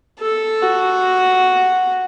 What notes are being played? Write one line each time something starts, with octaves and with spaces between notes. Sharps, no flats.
A4
F#4